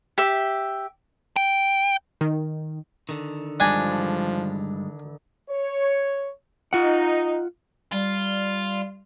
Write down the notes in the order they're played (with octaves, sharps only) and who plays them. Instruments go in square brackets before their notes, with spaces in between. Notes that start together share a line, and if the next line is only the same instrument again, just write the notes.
[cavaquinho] G4 E5
[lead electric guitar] G5
[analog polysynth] D#3
[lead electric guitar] D3 D#3
[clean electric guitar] G2 G3 G#3 [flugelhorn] F3 [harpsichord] D4 G#5
[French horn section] C#5
[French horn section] D#4 [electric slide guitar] F4 F#5
[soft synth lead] G3 [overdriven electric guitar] F4